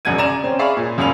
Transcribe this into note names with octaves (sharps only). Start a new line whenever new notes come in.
E1 A#1 F#2 F#5 G#6 D#7
C#3 D5 A#5 E7
C4 C#4
G#4 D5 E5 F5 B5 C#6
A#2
E1 F#2 F4 G#5 B5 F7